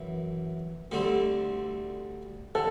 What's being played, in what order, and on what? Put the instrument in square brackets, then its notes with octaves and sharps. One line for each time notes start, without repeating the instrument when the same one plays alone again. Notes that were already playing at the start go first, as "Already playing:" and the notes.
Already playing: [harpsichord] F#2 E3
D2 D3 G3 C4
[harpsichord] D3 [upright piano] A4